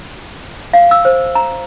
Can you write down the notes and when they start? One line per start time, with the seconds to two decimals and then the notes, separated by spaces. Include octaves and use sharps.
0.73 F5
0.91 E6
1.05 C5
1.35 A#5